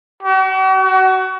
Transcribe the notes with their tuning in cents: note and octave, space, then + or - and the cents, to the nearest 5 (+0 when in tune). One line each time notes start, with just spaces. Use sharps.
F#4 +45
F#4 +30